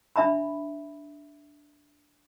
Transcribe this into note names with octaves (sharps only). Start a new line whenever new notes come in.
D4 E5 A#5 B5